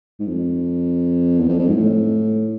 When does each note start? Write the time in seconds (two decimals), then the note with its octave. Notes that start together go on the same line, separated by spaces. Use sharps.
0.20 G#2
0.28 F2
1.40 E2
1.49 F2
1.59 F2
1.68 G#2
1.77 A2